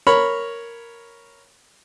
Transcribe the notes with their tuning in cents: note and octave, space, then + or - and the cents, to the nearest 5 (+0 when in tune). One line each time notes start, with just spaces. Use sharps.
A#4 +0 C#5 +0 B5 +0